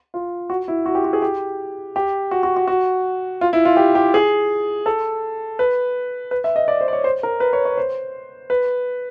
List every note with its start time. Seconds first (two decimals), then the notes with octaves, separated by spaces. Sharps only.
0.14 F4
0.50 F#4
0.68 E4
0.86 F#4
0.95 G4
1.04 F#4
1.13 G#4
1.22 G4
1.96 G4
2.31 F#4
2.43 F#4
2.56 F#4
2.68 F#4
3.41 F4
3.53 E4
3.65 F4
3.77 G4
3.95 G4
4.14 G#4
4.86 A4
5.59 B4
6.31 B4
6.44 E5
6.56 D#5
6.68 D5
6.81 C5
6.88 D5
6.93 C#5
7.04 C5
7.23 A#4
7.40 B4
7.53 C#5
7.65 C#5
7.78 C5
8.50 B4